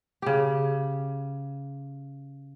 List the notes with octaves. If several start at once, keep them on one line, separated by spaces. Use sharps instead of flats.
C#3 G4